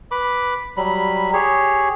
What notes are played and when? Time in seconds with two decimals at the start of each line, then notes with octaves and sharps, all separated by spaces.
0.11 B4 B5 D6
0.77 F#3 G3 B5
1.33 G4 G#4 C#5